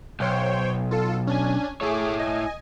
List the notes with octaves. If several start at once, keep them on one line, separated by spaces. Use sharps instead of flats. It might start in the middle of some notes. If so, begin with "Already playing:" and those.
B1 C5 C#5 G5
F4 A4
C#4 D4 G#5
A3 E4 G#4 C#5 D6
D#5 G#5